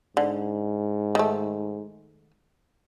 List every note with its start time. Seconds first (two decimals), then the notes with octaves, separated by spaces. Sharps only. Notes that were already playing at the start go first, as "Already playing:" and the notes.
0.17 G#2 D3
1.15 D#3 A3